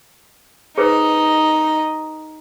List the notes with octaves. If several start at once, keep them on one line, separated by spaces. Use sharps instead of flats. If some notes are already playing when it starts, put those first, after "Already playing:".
D#4 G#4 B4 C5 D#5